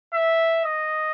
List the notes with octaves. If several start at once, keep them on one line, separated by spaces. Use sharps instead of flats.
E5
D#5